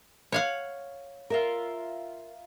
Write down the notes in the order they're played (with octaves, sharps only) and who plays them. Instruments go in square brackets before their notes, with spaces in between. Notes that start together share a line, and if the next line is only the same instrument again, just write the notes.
[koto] C#5 F5 F#5
[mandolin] F4 E5 A#5 [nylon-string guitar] A#4